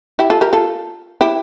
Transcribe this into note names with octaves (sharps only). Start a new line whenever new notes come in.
E4 G4
F4 A4
G4 A#4
F4 A4
E4 G4